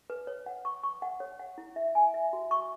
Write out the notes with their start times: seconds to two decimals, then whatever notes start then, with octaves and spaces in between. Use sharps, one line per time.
0.10 B4
0.27 C#5
0.46 F#5
0.65 C#6
0.83 C#6
1.02 F#5
1.20 C#5
1.39 F#5
1.58 E4
1.76 E5
1.95 G#5
2.14 E5
2.33 F#4
2.51 C#6